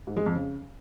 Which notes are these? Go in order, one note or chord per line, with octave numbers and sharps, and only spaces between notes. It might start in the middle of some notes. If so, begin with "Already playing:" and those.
G#2
G#3
F2
C#3